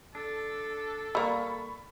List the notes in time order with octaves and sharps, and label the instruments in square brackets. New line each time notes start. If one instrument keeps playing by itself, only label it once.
[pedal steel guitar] D4 [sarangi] A4
[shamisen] G3 A#3 [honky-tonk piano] B5 [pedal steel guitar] C#6 E6